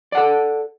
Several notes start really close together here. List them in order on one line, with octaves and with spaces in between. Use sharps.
D5 F#5 A4